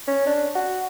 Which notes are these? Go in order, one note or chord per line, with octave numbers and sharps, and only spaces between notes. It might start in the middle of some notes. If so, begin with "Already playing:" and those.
C#4
D4
F#4